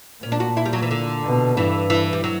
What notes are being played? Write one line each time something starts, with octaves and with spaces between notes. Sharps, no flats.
A#2 C#4
D4
F#4
E4
G3
F#3
E3
D3
B2
G2 E3
E3
G3
F#3